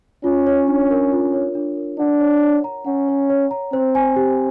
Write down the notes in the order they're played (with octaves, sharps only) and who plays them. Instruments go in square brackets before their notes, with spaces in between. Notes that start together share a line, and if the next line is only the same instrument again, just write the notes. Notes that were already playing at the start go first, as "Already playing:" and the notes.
[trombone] C#4 [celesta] F4
[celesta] C#5
D4
A#4
F4
C#5
D4
A#4
[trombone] D4 [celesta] F#5
[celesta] C#5
C#5
A#5
[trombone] C#4 [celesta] F#5
[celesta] C#5
C#5
A#5
[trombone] C4 [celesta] C5
[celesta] G#5
G4